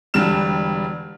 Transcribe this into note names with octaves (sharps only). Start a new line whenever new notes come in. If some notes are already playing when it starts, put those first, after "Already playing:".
E1 D3 G3 D4 F6 E7